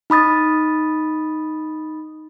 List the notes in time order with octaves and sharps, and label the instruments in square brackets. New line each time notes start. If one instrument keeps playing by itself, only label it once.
[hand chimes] D#4 B5 D#6 A6